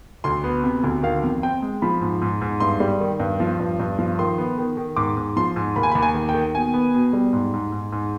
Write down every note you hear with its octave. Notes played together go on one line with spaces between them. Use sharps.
D2 C6
B3
C3
D2
D#3 F5
F2
C4 G5
G#3
F3 B5
G#2
G#2
G#2
G2 C6
G3
D#3
G2
F3
G2
G2
F3
D#3 C6
B3
D#3
D#3
G#2 D6
G#2
F3 C6
G#2
D#2 B5
G#5
B5
D#2
G#5
D#3
G5
D#3
B2 G#5
B3
B2
G3
G#2
G#2
G#2
G#2